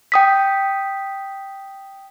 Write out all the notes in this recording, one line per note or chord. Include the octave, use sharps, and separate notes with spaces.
G5 D#6 B6